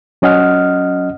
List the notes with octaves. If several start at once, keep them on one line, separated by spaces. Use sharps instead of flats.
F#3 C#4 D#5 F#5 F6